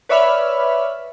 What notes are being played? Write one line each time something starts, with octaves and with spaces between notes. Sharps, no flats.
B4 C#5 D5 E5 B5 F6